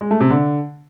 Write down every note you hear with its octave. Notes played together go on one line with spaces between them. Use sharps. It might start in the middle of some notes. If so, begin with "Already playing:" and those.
G#3
A3
C3
D3